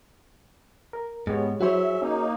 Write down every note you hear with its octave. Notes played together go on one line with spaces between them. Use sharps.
A#4
G#2 G#3 B3 G4 C#5
F#3 E4 F#4 G#4 C5 C#5 E5
A#3 C#4 D#4